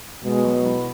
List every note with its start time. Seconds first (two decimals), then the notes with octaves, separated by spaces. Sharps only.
0.23 B2 G#3
0.44 F#3
0.65 E4